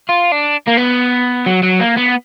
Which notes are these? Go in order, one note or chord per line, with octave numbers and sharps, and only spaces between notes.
F4
D4
A#3
B3
F#3
F#3
A#3
B3